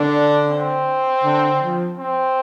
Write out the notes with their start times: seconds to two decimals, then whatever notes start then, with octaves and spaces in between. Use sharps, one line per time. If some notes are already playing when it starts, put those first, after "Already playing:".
Already playing: D3 D4
0.50 C4
1.24 D3
1.61 F3
1.99 C4